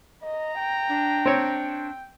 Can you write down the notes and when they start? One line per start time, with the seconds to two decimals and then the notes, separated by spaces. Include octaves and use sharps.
0.23 D#5 A#5
0.59 G5
0.89 D4
1.25 C4 C#5